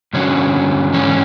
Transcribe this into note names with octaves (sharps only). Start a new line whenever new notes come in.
G2 D3 F#3 C#4
G#2 E3 C#4